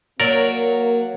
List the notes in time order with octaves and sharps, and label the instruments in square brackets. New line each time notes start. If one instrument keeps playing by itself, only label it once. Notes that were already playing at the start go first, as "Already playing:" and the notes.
[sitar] F#3 [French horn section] A#3 [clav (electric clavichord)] A#4 D5